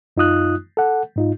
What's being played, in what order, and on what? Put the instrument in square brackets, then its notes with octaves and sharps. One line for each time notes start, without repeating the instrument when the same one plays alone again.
[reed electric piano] F#2 D#4 F4 D#6 F#6
A4 F#5
G#2 D#4 F4